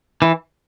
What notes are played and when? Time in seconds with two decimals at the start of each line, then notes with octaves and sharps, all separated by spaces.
0.22 E3